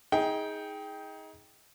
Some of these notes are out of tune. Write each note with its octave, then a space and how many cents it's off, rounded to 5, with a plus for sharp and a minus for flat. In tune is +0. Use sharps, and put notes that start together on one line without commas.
D#4 +30 G#4 +0 G5 +0